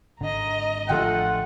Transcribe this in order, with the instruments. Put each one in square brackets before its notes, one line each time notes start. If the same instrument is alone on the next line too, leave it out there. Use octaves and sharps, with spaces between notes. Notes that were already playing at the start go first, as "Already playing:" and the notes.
[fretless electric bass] G#1 D3 [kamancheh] D#5 A#5
[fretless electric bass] A1 D3 F3 [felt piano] A3 F4 G5 [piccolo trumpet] F#5